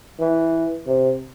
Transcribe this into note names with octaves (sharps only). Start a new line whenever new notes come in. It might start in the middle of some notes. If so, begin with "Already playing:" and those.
E3
C3